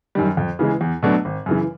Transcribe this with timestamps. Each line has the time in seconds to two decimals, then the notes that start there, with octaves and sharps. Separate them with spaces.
0.15 F#2 D#3 G3
0.37 F2
0.59 C#3 E3 G#3
0.81 E2
1.03 B2 F#3 A3 D4
1.25 G#1
1.46 F#2 C#3 E3